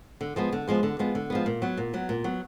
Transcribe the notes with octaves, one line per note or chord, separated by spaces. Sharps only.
D3
F3 G#3 B3
D3
F3 G#3 B3
D3
F3 G#3 B3
D3
F3 G#3 B3
A#2
F#3 B3
A#2
F#3 B3
A#2
F#3 B3